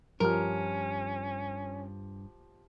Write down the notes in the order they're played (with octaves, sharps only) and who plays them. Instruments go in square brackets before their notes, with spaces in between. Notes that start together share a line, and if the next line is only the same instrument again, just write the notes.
[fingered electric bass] G2 [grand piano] F3 G4 F6 [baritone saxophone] C#4 [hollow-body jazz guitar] A#4